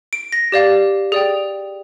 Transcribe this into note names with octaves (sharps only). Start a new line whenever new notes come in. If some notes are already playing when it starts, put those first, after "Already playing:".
D7
A#6
G4 D5 F5
G#4 D5 G5